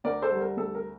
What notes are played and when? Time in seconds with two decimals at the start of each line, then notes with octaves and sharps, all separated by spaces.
0.04 D2 A#4 D5
0.22 A4 C5
0.31 G3
0.40 A#4
0.57 D2 A4
0.75 A#4